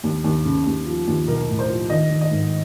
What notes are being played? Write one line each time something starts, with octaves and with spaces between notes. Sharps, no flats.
D#2
D#2
C#3
D#2
F3
D#2
B1 A#4
A2
C5
F3
D#3 D#5
D#3
D#5
G#2